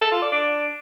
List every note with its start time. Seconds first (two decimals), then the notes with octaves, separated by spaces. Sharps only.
0.01 A4
0.12 F4
0.22 D5
0.32 D4